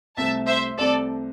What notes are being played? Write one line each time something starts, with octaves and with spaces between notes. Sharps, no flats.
C2 C3 A3 C4 E5 A5
C5 E5
C2 C3 A3 C4 A4 D5